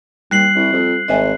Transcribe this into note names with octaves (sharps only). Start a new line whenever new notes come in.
D#2 G3 F#6 C7 F#7
C2
F2 G4
G#1 D#5 E5 G#5